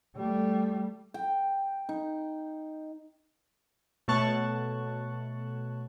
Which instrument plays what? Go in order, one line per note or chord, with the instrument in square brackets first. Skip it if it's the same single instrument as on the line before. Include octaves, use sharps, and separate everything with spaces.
[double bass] G3 A3
[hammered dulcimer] G5
D#4
[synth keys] B2 A3 C#5 A5 C#6 F#6